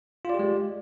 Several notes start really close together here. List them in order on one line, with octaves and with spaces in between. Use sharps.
F4 D5 G4 G#3